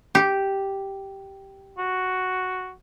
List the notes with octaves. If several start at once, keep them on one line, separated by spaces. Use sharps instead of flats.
G4
F#4